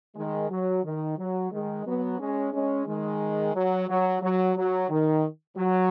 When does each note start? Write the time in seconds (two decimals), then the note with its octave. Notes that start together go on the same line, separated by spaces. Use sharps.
0.16 D#3 G#3
0.50 F#3
0.84 D#3
1.18 F#3
1.52 D#3 G#3
1.86 F#3 B3
2.19 G#3 C#4
2.53 G#3 C#4
2.87 D#3 G#3
3.55 F#3
3.88 F#3
4.22 F#3
4.56 F#3
4.90 D#3
5.57 F#3